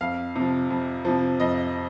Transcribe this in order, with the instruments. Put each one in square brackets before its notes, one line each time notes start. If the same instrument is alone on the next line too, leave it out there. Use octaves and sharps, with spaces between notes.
[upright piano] F2 F5
C3 F3
F2
C3 F3
F2 D#5